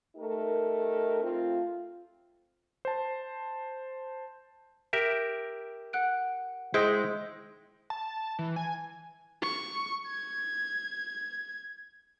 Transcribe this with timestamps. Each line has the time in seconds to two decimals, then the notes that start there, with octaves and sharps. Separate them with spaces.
0.16 A3 D#4 G4 A#4
1.22 A3 C4 F4
2.85 C5 A5
4.93 G4 A#4 E5
5.93 F#5 F#6 D7
6.74 G#3 D#4 E4 C5 G5
7.90 A5
8.39 E3
8.56 G#5
9.42 C#6
10.07 G#6